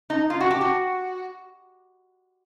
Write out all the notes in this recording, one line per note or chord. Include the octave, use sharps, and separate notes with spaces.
D#4
F4
F#4
G4
F#4